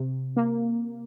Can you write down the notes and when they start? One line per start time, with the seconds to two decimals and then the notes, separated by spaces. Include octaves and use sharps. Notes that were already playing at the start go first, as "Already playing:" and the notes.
Already playing: C3
0.36 A#3